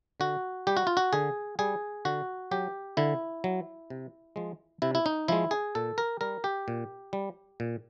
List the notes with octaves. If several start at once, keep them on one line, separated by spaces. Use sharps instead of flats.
D3 F#4
G3 G4
F#4
F4
F#4
D3 G#4
G3 G#4
D3 F#4
F#3 G4
D3 E4
F#3
C3
F3 G#3
C3 E4
E4
D#4
F3 G#3 E4
G#4
A#2 A4
A#4
G3 A#4
G4
A#2
G3
A#2